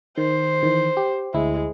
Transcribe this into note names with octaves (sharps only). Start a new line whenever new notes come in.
D#3 C5
D#3 E3
G4
D2 G#3 E4